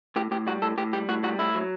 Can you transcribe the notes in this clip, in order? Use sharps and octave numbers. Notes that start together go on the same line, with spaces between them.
A2 G4
A2 G4
G3 F#4
A2 A4
A2 G4
G3 G4
A2 F#4
G3 F#4
A2 E4
F#3